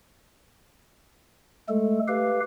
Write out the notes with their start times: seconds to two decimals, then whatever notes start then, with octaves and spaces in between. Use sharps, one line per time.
1.69 G#3 A3 A4
2.08 G4 B4 F5